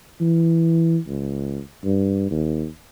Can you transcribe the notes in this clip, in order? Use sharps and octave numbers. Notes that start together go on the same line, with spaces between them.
E3
C#2
G2
D#2